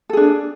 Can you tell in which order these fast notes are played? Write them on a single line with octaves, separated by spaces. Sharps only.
A4 G#4 D4